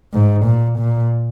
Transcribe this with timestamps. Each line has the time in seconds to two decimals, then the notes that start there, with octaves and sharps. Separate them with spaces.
0.13 G#2
0.45 A#2
0.78 A#2